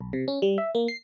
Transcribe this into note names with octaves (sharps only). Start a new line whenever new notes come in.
B1
C3
C#4
G3
E5
A#3
C7